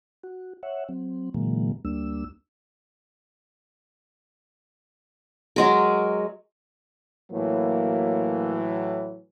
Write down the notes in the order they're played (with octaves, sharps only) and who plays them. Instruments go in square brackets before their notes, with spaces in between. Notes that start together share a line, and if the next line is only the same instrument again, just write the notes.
[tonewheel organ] F#4
C#5 E5 F#5
F#3 C4
A#2 D3 E3 F#3 G#3 A#3
D2 G3 A#3 D4 E6
[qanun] F#3 G#3 A#4
[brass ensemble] A2 E3 F#3 [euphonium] A#3